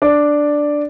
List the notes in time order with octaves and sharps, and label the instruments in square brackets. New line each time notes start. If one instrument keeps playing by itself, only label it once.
[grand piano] D4 D5